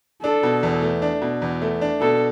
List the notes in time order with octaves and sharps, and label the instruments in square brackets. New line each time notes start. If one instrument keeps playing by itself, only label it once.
[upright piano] D4 [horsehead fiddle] A4
[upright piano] B2
E2
A3
D4
B2
E2
A3
D4
[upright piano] B2 [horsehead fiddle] A4